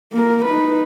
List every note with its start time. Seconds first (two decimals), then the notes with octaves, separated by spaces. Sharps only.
0.12 A#3 A#4
0.45 D#4 B4